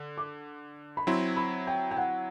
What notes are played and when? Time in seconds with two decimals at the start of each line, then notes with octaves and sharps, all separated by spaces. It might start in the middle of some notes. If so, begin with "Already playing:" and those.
Already playing: D3
0.18 D6
0.97 B5
1.07 F#3 C4 E4 C6
1.37 B5
1.67 G5
1.91 G5
1.97 F#5